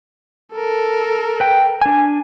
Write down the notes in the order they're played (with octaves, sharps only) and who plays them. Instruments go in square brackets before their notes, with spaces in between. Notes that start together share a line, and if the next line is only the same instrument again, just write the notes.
[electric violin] A4 A#4
[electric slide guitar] B4 G5
D4 G#5